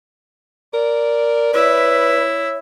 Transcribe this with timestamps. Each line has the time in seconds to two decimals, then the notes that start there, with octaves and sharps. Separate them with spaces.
0.74 A#4 D5
1.54 E4 B4 C#5 E5